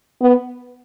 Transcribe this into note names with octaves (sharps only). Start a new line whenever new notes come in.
B3